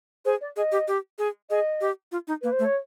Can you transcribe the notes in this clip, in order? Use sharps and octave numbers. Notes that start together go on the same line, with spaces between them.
G#4 C5
D5
G#4 D#5
G4
G4
G#4
G#4 D#5
G4
F4
D#4
A#3 B4
C5
A3
C#5